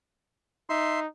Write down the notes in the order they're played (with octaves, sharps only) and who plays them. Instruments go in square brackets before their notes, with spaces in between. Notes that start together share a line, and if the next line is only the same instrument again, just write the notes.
[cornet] D#4 [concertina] E5 C6